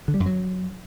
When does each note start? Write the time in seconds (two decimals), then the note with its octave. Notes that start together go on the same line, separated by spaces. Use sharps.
0.08 D3
0.14 G3
0.20 F#2
0.26 F#3